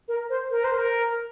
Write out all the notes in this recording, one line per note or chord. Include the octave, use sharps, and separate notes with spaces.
A#4
C5
A#4
C5
A#4